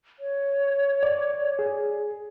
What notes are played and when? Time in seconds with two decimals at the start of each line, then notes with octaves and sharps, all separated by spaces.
0.19 C#5
1.03 D5
1.59 G#4